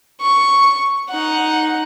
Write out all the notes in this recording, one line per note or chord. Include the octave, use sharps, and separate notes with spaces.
C#6
D#4 F#5